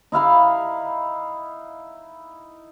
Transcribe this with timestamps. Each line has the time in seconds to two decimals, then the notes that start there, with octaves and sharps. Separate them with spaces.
0.12 D#4 E4 F5 B5